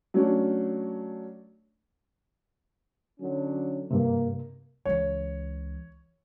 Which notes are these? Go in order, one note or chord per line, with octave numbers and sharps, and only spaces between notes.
F#3 A3 C#4 D4
D3 F#3 C#4
G2 C3 A#3
C#2 E3 C#5